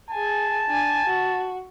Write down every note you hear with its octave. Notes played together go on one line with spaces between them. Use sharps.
G#4 G#5 A5
D4 G#5
F#4